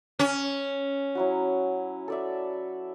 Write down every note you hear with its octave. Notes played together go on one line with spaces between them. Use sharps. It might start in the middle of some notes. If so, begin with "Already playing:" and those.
C#4
F#3 E4 F#4
A4 D5 E5